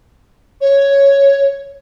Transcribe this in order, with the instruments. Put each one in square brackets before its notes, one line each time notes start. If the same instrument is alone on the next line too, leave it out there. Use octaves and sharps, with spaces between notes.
[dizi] C#5